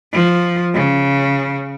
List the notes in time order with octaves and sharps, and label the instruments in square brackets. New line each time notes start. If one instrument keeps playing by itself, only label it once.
[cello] F3
C#3